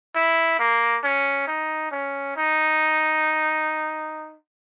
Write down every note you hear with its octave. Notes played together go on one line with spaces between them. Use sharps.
E4
A#3
C#4
D#4
C#4
D#4